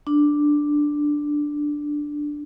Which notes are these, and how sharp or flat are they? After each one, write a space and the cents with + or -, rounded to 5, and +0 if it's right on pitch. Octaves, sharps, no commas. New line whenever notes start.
D4 +5